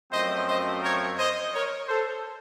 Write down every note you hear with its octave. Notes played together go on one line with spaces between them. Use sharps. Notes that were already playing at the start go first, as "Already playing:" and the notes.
F#2 F3 A3 C4 C5 D#5
C5 D#5
A#4 C#5
C5 D#5
A#4 C#5
A4 C5